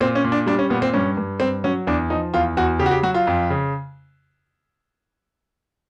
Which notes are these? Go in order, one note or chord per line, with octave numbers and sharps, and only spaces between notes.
A#2 C4
C#4
A#2
D4
G3 D4
C#4
A#2 B3
C4
G2 C#4
G2
G2 C4
F#3 C#4
E2 D4
F3 D#4
E2 F4
E2 F#4
C#3 G4
F#4
G4
F#3 F#4
F4
F2
C#3